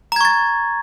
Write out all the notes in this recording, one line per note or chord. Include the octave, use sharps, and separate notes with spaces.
A#5 C#6 G#6 A6